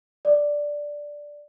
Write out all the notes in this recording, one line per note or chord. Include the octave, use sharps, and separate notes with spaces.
D5